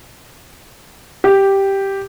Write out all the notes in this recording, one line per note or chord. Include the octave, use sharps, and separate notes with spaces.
G4